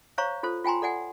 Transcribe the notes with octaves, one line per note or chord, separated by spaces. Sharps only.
C5 C#5 F5 A#5 C#6
F4 A4 C5
F4 G5 G#5 A#5 C6
A4 D5 F#5 G#5